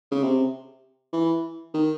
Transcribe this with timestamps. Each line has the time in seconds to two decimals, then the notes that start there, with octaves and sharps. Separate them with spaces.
0.12 C#3
0.23 C3
1.13 E3
1.74 D#3